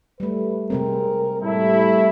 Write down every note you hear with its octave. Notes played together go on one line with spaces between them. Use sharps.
G3 A3 B4
C3 G#3 C4 A#4
A2 G3 A3 E4